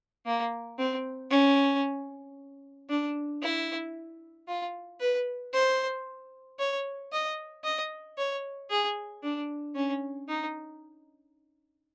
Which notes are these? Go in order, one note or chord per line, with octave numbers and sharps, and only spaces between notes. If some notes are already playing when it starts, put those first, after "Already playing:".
A#3
C4
C#4
D4
E4
F4
B4
C5
C#5
D#5
D#5
C#5
G#4
D4
C#4
D#4